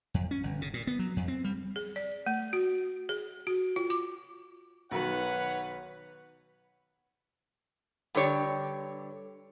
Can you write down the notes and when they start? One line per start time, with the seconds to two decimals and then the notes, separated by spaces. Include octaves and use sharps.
0.14 F2
0.31 C#4
0.43 G1
0.62 C#3
0.74 A#2
0.87 B3
0.99 F#3
1.16 F2
1.28 C4
1.44 G3
1.76 G#4
1.96 D5
2.26 A3
2.53 F#4
3.09 G#4
3.47 F#4
3.76 F4
3.90 D6
4.91 B1 D#3 F#4 B4 C#5 F#5
8.15 G2 D3 G4 C#5 D5